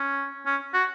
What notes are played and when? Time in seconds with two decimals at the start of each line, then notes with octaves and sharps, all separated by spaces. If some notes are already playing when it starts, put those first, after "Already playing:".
Already playing: C#4
0.46 C#4
0.74 F#4